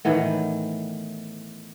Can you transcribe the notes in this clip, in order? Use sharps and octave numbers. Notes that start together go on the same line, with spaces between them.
A2 D#3 E3 B3